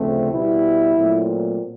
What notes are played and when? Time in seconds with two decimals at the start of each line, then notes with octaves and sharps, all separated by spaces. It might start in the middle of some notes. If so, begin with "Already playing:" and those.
Already playing: D2 C#3 F3 A3 C4
0.32 B2 G3 B3 E4
0.96 A#2 F#3 A3 C4